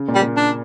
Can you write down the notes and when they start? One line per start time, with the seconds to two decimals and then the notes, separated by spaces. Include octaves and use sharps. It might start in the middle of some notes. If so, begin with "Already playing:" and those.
Already playing: C#3
0.08 A#2
0.15 G3
0.22 A#2
0.37 D4